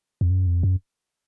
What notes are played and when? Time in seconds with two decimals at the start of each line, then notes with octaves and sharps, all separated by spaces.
0.21 F2
0.30 F#2
0.47 F2
0.63 F#2